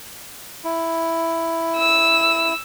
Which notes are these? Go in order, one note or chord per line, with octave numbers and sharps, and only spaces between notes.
E4
E6